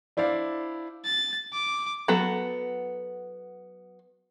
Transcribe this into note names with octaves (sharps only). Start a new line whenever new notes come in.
D4 E4 C5 D5 F5
A6
D6
F#3 B3 A4